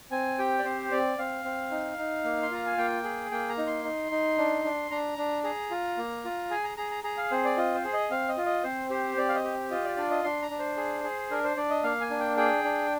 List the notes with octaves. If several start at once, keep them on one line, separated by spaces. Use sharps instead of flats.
C4 G#5
G4 G5
D5
C4 C5
C4 D5
C4 F5
C4
D#4
D#4
A#3
C6
F4 A#5
G#5
A#3 G5
G#4
A#3 G5
A#5
D#4
C6
D#4
D#4
D4
D4
D4 A#5
D4
G#4 A#5
F4
A#3
F4
G#4 G#5
A#5
G#4 A#5
A#5
G#4 A#5
F5
C4 C5
D5
F4 D#5
C5
G#4
D#5
C4 F5
D#5
F4
D#5
C4 C5
G4 C5
C4 D5
F5
D#5
G4
F4 D#5
D5
D4 D5
D#5
D4 C6
A#5
D4
C5
G#4
G#4
D4 A#4
C5
D4 D5
D#5
A#3 F5
G#5
D4
G5
G#4 G5
D4